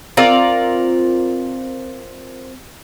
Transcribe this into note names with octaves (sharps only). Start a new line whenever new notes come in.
C4 F4 A#4 D5